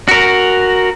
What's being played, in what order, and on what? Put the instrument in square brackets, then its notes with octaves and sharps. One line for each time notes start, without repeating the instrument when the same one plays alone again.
[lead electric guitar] F#4 A#4